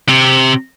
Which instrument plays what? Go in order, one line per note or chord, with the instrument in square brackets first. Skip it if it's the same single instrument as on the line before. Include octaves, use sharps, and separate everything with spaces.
[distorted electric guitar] C3